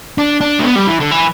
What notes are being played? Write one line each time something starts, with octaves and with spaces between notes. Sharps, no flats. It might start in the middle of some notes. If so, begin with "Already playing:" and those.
D4
D4
A3
B3
G3
E3
D3
E3